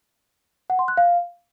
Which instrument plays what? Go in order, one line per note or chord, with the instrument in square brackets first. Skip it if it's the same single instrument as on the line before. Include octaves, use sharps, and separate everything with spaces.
[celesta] F#5
C6
F#6
F5